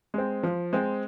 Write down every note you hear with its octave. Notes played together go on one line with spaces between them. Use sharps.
G#3 C4
F3
G#3 C4